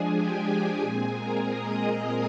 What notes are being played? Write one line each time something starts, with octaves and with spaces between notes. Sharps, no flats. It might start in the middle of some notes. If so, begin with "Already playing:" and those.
Already playing: F3 G#3 D4 G#4 G#5
G4 G5
G4 G5
A#2 G#3 C4 G#4 G#5
A#4 A#5
D#5 D#6